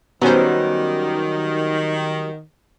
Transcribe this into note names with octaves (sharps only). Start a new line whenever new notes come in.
D#3 F#3 G3 B3 C#4 C5